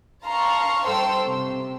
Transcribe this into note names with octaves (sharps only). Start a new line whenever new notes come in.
F5 A5 A#5 C6 C#6
G2 A4 C5 G5 C6 E6
C3